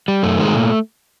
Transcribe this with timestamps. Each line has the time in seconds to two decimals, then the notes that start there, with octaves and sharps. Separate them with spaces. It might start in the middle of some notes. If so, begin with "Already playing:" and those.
0.08 G3
0.23 F#2 A3
0.38 D#3 G#3
0.54 A#2